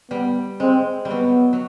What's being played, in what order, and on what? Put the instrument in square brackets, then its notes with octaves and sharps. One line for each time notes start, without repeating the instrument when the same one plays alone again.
[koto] G3 [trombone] B3
[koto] G#3 [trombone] C4
[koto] G3
[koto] F#3 [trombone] B3
[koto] F#3